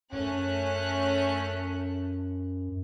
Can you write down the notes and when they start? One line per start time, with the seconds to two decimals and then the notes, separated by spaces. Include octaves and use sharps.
0.12 F#2 A3 C#4 F#6